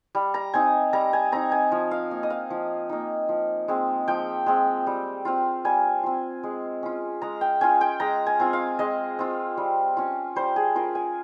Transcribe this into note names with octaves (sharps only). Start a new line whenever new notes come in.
G3
A#5
C4 D#4 G#5
G3 A#5
G#5
C4 D#4 A#5
G#5
F3
F5
A#3 D#4
D#5
F5
F3
A#3 D#4
F3
G#3 C4
F3 G5
G#3 C4
G3
C4 F4
G3 G#5
C4 F4
G#3
C#4 F4
G#3 A#5
G5
C#4 F4 G#5
G5
G#3 A#5
G#5
C4 F4
F5
G#3 D#5
C4 F4
G3
C#4 F4
G3 C5
G#4
C#4 F4 A#4
G#5